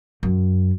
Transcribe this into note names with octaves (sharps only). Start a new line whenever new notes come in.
F#2